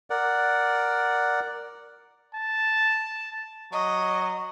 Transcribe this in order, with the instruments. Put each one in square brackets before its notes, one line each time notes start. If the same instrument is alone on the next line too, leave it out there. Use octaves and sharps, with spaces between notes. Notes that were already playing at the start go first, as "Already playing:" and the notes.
[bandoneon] A#4 D5 F#5
[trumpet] A5
[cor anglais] F#3 [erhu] D#5